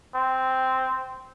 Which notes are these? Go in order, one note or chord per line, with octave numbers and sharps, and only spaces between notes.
C4